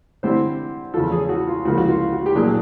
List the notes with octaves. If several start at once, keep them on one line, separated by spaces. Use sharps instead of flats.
D3 G3 C4 E4 C5
E2 C#3 F3 A4
G#4
F#4
F4
C#2 C#3 F3 A#3 F#4
F#4
F4
F#4
G4
A#2 F#3 A#3 D4 G#4